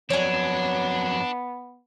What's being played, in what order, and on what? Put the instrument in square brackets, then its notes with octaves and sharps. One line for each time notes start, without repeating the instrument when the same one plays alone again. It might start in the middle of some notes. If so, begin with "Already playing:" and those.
[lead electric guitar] F2 F#3 [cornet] B3 [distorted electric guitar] D4 [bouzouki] C#5 G#5